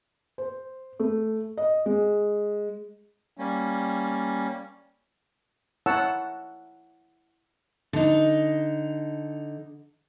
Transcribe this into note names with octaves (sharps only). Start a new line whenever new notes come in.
C5
A3
D#5
G#3
G3 A#3 C#4
E4 A#4 C#5 F#5 A5 E6
D3 D#4